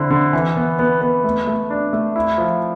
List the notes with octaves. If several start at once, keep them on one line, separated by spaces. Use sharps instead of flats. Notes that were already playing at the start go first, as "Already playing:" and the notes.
Already playing: D3 C4 E4
D3
E3
B3
B3
B3
A3
A3
D4
A3
E4
F3